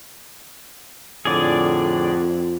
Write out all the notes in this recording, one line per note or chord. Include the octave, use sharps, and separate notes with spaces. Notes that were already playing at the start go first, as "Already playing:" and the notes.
F2 A2 D3 G#4 D5